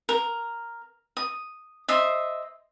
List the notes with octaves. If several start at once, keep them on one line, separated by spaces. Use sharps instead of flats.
A#4
D#6
C5 D#5 E5